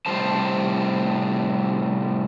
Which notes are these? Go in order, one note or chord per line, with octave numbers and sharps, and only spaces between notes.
A2 C3 G3 A3 C5 A5